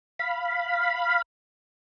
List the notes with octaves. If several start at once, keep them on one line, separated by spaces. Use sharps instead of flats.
F5 B5